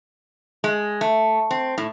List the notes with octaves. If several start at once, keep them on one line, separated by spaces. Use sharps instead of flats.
G#3
A3
C4
A2